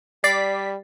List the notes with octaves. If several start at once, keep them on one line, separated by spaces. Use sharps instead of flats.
G3 D5 A6 B6 C7